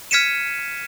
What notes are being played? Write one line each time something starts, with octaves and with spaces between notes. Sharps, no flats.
F6 G#6 B6 C#7 D#7 E7